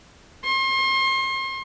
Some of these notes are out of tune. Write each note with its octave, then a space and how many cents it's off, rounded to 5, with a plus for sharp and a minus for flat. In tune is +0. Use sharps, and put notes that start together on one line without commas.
C6 +35